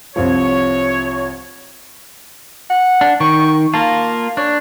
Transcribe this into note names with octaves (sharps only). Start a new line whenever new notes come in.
C2 F3 C#5
F#5
D4
D#3 C#6
A#3 F4 A5
D4 C#5